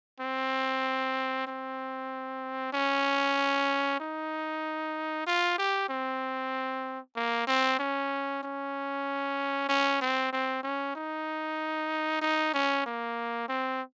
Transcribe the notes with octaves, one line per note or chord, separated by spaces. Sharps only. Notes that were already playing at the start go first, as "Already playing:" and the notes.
C4
C4
C#4
D#4
F4
G4
C4
A#3
C4
C#4
C#4
C#4
C4
C4
C#4
D#4
D#4
C#4
A#3
C4